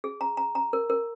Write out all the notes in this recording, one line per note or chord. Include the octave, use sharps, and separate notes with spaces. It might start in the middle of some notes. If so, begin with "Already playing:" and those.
G#4
A#5
A#5
A#5
A#4
A#4